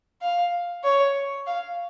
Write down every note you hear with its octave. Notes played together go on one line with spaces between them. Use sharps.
F5
C#5
F5